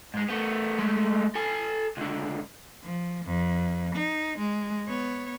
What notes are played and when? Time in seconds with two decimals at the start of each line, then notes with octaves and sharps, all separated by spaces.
0.14 G#2 G#3
0.28 A3 B3
0.78 G#3 A3
1.35 A4 G#5
1.97 C#2 D3
2.83 F3
3.26 F2
3.95 D#4
4.38 G#3
4.87 B3 C#5